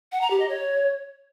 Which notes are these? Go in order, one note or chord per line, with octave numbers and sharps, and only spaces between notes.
F#5
A#5
G4
D#5
C#5